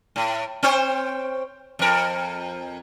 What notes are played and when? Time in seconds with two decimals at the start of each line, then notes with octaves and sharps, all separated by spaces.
0.16 A2
0.63 C4 C5 C#5
1.79 F2 A#4